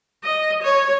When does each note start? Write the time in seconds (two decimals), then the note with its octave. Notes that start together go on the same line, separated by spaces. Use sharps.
0.24 D#5
0.63 C#5